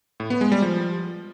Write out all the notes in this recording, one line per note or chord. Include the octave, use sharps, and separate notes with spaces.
A2
B3
G#3
G3
F3